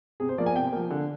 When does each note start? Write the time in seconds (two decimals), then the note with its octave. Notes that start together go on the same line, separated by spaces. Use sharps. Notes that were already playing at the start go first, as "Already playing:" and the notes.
0.20 C3 G#4
0.29 C5
0.38 F3 A#3 D5
0.46 G#5
0.56 C3 G5
0.73 F3 A#3
0.90 D3